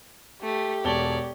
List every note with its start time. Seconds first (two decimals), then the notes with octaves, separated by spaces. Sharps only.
0.43 A3 G4
0.84 E1 C#5 D5 A5 G7